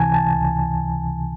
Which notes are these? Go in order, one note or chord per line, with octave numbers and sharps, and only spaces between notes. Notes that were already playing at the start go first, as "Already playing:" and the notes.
Already playing: C#2 C3 E3 G#5 A5
A5
C#2